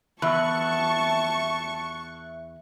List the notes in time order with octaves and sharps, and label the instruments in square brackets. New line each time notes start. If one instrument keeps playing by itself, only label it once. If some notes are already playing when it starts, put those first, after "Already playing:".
[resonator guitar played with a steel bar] E2 [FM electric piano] E5 F#6 [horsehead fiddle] A5 [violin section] C#6